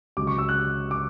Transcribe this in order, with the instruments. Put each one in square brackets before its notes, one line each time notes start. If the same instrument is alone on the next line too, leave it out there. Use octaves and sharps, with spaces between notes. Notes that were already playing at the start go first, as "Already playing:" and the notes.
[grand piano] C#2 C#3 F#3 D6
C#6
E6
F#6
D6